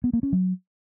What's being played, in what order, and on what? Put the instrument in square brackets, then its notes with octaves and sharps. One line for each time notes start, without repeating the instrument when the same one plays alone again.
[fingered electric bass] B3
A#3
C#4
F#3